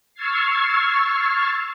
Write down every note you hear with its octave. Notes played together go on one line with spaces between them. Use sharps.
C#6 E6 F6 G#6 A6 C7